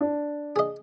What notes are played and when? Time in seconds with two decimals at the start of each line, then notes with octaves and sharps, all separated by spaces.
0.01 D4
0.56 G#4 D#5